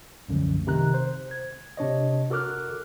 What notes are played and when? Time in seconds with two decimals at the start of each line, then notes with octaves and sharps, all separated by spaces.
0.29 C2 F#2 D3 F3 A3
0.67 C3 D#3 A#5 F#6
0.94 C5
1.31 G#6
1.77 C3 D4 C#5 D#5
2.30 F#4 A4 A#4 D6 F6 F#6